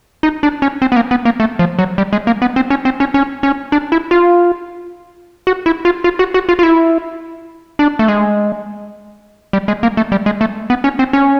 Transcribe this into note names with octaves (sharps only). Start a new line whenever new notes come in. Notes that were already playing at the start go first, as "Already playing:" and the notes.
D#4
D4
C#4
C4
B3
A#3
B3
A#3
A3
F3
F#3
G3
G#3
A#3
B3
C4
C#4
C4
C#4
C#4
C#4
D4
E4
F4
F#4
E4
F4
F4
F#4
F#4
F4
F4
E4
D4
A3
G#3
G3
G#3
A#3
A3
G3
G#3
A3
B3
C#4
C4
C#4